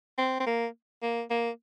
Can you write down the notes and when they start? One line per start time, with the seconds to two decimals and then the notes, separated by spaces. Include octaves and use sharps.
0.18 C4
0.40 C4
0.47 A#3
1.03 A#3
1.30 A#3